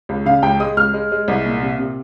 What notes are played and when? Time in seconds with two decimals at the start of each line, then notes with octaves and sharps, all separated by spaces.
0.09 C#2
0.26 C#3 F5
0.42 C#2 G5
0.60 G#3 D#6
0.77 C#2 F6
0.94 G#3
1.12 G#3
1.28 C2
1.46 A#2
1.62 C3
1.79 C3